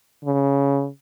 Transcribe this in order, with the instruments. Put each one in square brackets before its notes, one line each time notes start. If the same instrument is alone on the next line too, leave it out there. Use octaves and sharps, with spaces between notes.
[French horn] C#3